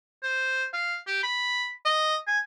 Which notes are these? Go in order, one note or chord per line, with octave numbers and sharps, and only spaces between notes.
C5
F5
G4
B5
D#5
G#5